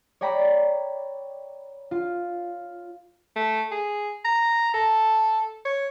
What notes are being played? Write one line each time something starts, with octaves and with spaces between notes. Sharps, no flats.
C#5 D5 G5 A#5 B5
F4
A3
G#4
A#5
A4
C#5